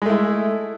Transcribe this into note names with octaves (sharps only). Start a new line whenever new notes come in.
G#3 A3 E4